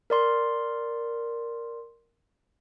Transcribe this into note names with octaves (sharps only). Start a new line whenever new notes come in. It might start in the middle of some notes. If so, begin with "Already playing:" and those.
A#4 D5 C6